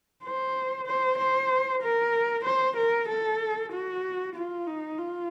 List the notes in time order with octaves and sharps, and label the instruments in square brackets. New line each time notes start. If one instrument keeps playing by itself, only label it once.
[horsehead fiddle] C5
C5
C5
A#4
C5
A#4
A4
F#4
F4
D#4
F4